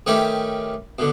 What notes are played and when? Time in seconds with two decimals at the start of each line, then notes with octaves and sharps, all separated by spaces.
0.06 D#3 A3 C#4 D#4 G4 B4
0.99 B2 D3